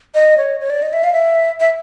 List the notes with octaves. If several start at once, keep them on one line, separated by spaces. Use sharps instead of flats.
D#5
C#5
C#5
D5
D#5
E5
F5
E5
E5